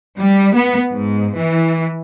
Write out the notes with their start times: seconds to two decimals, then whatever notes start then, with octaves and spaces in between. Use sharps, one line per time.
0.20 G3
0.55 B3
0.92 G#2
1.37 E3